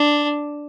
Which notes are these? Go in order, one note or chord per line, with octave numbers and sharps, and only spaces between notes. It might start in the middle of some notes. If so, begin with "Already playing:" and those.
Already playing: D4